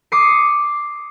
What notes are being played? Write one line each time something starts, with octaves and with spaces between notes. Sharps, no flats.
D6 D#6 C7 C#7